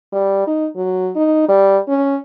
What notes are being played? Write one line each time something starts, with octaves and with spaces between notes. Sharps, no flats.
G3
D#4
F#3
D#4
G3
C#4